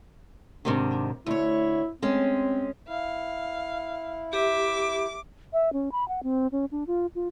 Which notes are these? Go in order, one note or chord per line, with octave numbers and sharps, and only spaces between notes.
G#2 C3 D#3 D4
D2 E4 C#5
G#3 C4 C#4
E4 F5
G4 E5 D6
E5
C#4
B5
F#5
C4
C#4
D4
F4
F4